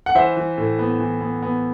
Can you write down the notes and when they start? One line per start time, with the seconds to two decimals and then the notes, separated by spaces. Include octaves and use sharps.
0.06 F#5
0.15 E3 C5 E5
0.37 E3
0.58 A2
0.79 B3
1.00 E3
1.21 B3
1.42 B3